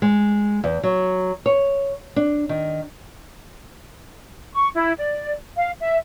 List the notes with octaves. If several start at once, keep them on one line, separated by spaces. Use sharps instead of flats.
G#3
E2
F#3
C#5
D4
D#3
C#6
E4
D5
F5
E5